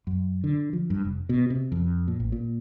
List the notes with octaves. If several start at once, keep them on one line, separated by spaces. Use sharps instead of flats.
F#2
D3
F3
G2
F1
B2
C3
F2
A#2
A1
A#2